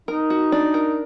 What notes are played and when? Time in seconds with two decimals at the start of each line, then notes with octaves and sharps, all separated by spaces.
0.08 D#4 A#4
0.30 F#4
0.52 D4
0.74 A#4